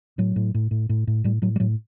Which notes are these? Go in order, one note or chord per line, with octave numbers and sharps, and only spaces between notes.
A2 F#3
A2
A2
A2
A2
A2
A2 G3
A2 F#3
G3
A2 F#3